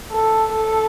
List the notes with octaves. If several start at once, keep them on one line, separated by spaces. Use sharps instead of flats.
A4
A4